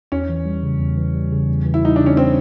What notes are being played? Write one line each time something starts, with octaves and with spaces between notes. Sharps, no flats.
E2 C#4
E3
G3
C#3
E2
E3
G3
C#3
E2
E3
E4
G3 D#4
C#3 D4
C#4
C4